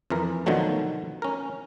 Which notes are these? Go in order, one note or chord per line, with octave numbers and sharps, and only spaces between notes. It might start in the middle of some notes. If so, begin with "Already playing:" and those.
F2 E3 A#4
B2 D3 D#3 F3 F#3 A3
C#4 A#4